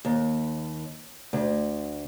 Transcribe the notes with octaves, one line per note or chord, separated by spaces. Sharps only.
D#2
D2